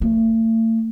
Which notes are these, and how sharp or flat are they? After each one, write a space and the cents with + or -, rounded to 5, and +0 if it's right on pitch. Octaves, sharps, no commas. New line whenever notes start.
A3 +40